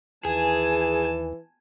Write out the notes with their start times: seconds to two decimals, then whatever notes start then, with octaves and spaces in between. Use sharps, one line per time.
0.25 D#2 E3 G#4 G#5 A5